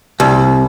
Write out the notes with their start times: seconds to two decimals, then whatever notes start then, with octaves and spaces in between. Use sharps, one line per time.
0.20 C2